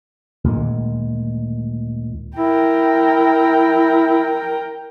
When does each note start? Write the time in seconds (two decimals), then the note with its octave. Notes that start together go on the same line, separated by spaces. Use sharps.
0.44 D2 A#2 D#3 G#3
2.37 E4 A#4 G5